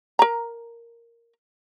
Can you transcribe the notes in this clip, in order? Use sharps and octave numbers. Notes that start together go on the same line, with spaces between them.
A#4 A#5